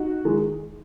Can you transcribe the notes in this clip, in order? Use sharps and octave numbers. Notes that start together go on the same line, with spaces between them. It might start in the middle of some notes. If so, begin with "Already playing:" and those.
Already playing: D#4 F#4
D#3 G#3